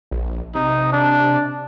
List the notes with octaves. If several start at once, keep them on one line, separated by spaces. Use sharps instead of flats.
A#1
C3 D#4
D4